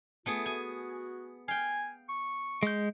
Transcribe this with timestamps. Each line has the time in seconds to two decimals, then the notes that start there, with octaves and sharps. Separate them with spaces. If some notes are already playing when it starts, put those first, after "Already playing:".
0.26 A3 B3 F4 G#4
0.46 F#4 G#5
1.48 F5 G5 G#5
2.09 C#6
2.63 G#3 G6